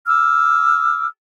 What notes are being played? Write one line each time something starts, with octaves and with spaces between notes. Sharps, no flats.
D6 E6 F6